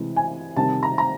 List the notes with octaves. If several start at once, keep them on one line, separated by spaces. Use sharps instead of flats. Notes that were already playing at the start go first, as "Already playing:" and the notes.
Already playing: C3 E3 G#3
G#5
C3 D#3 G3 A5
A#5
A#5